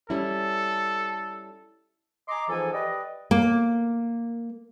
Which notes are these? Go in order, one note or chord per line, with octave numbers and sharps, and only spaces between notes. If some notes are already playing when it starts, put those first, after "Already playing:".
G3 C#4 E4 A4
D#5 G#5 A#5 C6 D6
F2 G#2 E3 F3 A4 G#5
G4 B4 D5 D#5
A#3